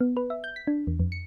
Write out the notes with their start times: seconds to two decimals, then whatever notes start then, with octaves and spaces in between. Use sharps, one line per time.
0.01 B3
0.17 B4
0.30 E5
0.44 G6
0.56 B6
0.67 D4
0.87 E2
1.00 F2
1.12 C#7